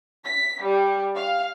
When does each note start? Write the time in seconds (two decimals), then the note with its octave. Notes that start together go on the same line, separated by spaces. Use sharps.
0.24 B6
0.63 G3
1.15 F5